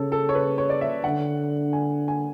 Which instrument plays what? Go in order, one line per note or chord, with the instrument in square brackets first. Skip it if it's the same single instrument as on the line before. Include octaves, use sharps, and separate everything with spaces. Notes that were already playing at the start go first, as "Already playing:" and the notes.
Already playing: [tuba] C#3 [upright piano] A4 C#5
[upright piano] A4
C#5
B4
C#5
D5
E5
[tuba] D3 [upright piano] F#5
[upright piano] G#5
G#5